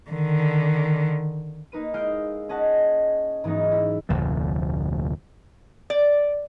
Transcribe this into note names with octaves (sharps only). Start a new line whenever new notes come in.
D3 D#3
A#3 D#4 B4 D#7
G#3 E4 F5 D#6 G6 D7
C#4 G#4 D#5 F#5 A5
G#2 E3 F#3 B3 D#4
E4
F1 D2 A#2 F3
D5